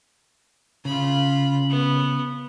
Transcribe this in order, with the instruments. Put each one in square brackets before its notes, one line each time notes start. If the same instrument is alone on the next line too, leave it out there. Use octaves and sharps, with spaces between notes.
[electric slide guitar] C#3 [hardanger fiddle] F4 B5
[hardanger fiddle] B3